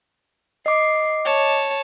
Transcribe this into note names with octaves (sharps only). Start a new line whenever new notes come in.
D#5 D6 C7
C#5 A5